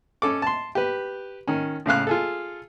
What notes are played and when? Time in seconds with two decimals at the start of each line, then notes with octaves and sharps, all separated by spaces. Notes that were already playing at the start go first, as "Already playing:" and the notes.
0.22 C#4 A4 D6
0.42 A5 C6
0.75 G4 B4
1.47 D#3 C#4
1.86 A2 C#3 F5 F#6
2.07 F4 G#4 A4